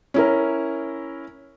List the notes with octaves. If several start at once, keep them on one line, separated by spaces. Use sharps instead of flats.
C#4 E4 A#4